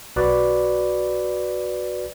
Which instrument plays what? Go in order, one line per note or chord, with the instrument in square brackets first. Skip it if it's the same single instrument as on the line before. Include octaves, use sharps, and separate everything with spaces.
[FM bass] B1 [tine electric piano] F#4 B4 D5